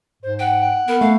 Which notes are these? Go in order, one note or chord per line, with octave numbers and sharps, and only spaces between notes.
G#2 C5
F#5 G5
B3 A#4
A3 F5